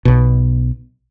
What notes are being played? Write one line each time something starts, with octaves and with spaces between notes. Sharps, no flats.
B1 B2